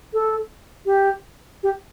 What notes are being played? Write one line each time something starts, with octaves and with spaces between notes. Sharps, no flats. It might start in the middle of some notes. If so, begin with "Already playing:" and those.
A4
G4
G4